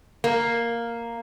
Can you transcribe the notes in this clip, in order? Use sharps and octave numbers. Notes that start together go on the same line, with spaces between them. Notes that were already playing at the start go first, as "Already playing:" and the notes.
A#3